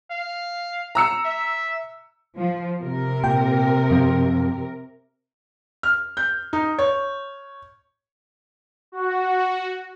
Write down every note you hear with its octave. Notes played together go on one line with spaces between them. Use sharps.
F5
A#5 E6 C#7
E5
F3
C3 A#4
A#2 G5
F#2 F3 C4
F6
G6
D#4
C#5
F#4